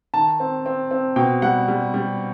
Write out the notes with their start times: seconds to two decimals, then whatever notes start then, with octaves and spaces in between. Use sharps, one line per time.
0.14 D#3 A5
0.40 C4
0.66 C4
0.91 C4
1.16 B2 G5
1.42 G3 F#5
1.68 G3
1.94 G3